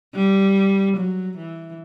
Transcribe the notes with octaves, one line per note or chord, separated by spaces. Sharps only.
G3
F#3
E3